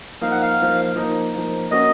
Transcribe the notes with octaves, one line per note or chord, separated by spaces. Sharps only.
F3 A#3 D#4 F5
F#5
F5
F3 A#3 D#4
F3 A#3 D#4
F3 A#3 D#4
A#3 C#4 F#4 C#5 D#5